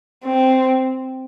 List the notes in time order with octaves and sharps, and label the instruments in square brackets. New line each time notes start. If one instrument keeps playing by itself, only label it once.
[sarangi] C4